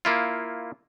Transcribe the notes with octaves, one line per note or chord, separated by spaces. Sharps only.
A#3 E4 F4